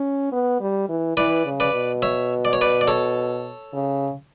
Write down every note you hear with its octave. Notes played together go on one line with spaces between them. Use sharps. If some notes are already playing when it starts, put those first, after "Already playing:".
Already playing: C#4
B3
G3
E3
E3 B4 D5
C#3
B4 D5
B2
C#5 E5
D5
C#5
B4 D5
D5
A4 C#5
C#3